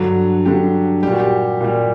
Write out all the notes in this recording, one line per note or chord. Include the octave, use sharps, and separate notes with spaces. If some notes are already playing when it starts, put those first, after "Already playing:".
Already playing: G2 D3 F#3
G2 D3 F#3 G4
G3 G4
A#2 F#4
G4
A#2 G3